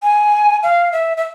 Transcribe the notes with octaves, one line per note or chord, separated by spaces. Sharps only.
G#5
F5
E5
E5